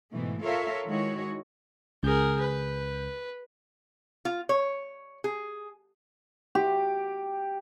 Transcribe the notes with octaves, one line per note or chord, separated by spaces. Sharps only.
G#2 B2 E3 A3
F4 A4 A#4 C#5 E5 F5
D#3 G#3 E4 F#4 C#5
C#2 G#4 A#4 G6
B4
F4
C#5
G#4
G4